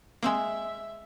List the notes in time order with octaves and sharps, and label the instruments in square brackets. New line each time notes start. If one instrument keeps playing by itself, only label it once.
[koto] G#3 F5 [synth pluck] A#3 C4 E6 [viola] E5